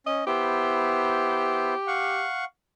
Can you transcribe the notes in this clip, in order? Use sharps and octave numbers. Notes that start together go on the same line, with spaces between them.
C#4 D#5
B3 E4 G4 C5
F5 F#5 C#6